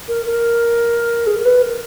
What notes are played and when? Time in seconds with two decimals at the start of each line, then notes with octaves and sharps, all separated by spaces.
0.09 A#4
0.26 A#4
1.27 G#4
1.36 A#4
1.45 B4
1.62 A#4